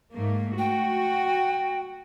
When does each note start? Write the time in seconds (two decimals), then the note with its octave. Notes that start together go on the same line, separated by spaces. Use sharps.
0.13 G#2 A3 A#3
0.58 F#4 G5